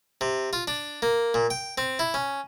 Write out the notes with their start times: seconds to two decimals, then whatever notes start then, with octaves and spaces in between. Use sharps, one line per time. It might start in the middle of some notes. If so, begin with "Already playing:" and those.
0.21 C3
0.53 F4
0.68 D4
1.02 A#3
1.34 A#2
1.50 G5
1.78 C4
1.99 E4
2.14 C#4